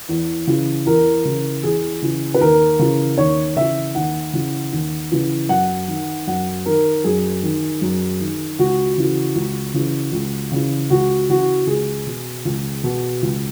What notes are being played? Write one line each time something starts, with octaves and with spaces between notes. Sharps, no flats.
E2
C#3 E3
E2 A#4
C#3 E3
E2 G#4
C#3 E3
B4
D#2 A#4
C#3 E3
D#2 C#5
C#3 E3 E5
D#2 F#5
C#3 E3
D#2
C#3 E3
F#2 F#5
D#3
F#2 F#5
D#3 A#4
F#2 G#4
D#3
F#2
D#3
C#2 F#4
C#3 E3
C#2
C#3 E3
C#2
C#3 E3
C#2 F#4
C#3 E3 F#4
C#2 G#4
B2
C#2
B2
C#2